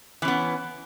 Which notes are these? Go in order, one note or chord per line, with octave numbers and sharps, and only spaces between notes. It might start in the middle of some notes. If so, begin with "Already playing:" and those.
E3 B3 C#4